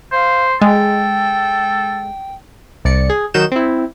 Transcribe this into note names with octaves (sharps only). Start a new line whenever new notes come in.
C5 F5
G#3 A4 G5
C2 D5 C#7
G#4
D#3 F#3 D#4 F#4 G6 E7
C4 E4